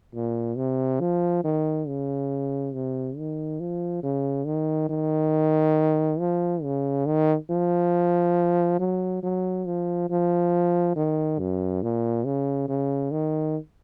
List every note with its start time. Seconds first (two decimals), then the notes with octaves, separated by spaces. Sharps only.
0.14 A#2
0.57 C3
1.00 F3
1.44 D#3
1.88 C#3
2.74 C3
3.18 D#3
3.60 F3
4.03 C#3
4.46 D#3
4.89 D#3
6.20 F3
6.63 C#3
7.06 D#3
7.50 F3
8.79 F#3
9.23 F#3
9.66 F3
10.10 F3
10.96 D#3
11.39 F#2
11.83 A#2
12.25 C#3
12.68 C#3
13.11 D#3